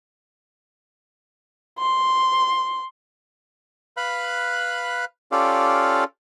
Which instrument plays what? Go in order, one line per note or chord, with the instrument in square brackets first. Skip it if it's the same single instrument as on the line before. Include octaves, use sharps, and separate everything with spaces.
[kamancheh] C6
[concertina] B4 F5 B5 F#6
C#4 F4 G4 A4 D5 F5